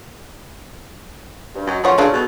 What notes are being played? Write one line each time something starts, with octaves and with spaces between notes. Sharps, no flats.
G2
F#2 D#5 F#5
A2 F3 G#3 C#4 C#5 F#5
C#3 F#3 D4 F4
B2 G#3 B3 A4